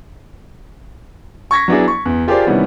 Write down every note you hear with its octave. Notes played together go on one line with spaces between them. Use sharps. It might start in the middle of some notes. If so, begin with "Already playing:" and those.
C#6 G#6 A#6 B6
F#3 B3 D4 E4 G#4
C#6
E2
F4 G4 G#4 A#4 C5 D5
C3 D#3 E3 G3 B3 C#4